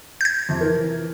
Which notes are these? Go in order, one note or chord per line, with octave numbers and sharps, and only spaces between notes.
G6 G#6
F2 C3
E3 A#4